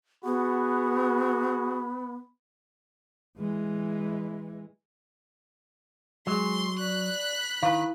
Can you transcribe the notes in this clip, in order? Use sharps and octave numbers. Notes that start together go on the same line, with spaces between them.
B3 F#4 G#4 B5
E3 G#3
F#3 G#3 C6
D5 B5 F#6
D#3 E4 B4 F5 A5